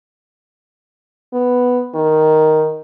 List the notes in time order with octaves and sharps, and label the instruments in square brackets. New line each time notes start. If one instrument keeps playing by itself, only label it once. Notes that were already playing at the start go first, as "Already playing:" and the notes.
[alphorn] B3
D#3